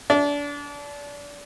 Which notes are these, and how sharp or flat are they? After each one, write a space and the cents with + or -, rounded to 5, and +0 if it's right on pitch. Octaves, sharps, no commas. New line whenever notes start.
D4 -30